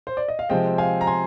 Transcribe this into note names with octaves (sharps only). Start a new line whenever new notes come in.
C5
D5
D#5
F5
C3 F3 G#3 C4 D#5 G5
F5 G#5
A#5
G#5 C6